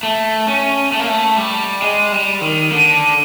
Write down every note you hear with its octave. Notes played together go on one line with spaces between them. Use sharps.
A3
C#4
A3
A#3
A3
G3
G#3
G3
D#3
D3